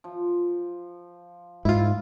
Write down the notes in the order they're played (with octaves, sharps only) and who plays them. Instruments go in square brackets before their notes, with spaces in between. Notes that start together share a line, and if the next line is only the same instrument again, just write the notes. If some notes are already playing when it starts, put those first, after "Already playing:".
[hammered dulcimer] F3
[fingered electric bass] G#2 [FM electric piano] E4 F4